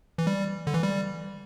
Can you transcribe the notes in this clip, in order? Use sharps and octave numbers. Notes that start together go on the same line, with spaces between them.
E3
G3
D3
E3
G3